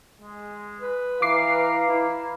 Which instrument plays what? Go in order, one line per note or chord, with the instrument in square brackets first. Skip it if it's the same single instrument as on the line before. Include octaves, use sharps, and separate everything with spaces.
[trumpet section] G#3
[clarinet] B4
[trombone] E3 [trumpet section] F5 A#5 [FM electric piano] D6 C7
[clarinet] E4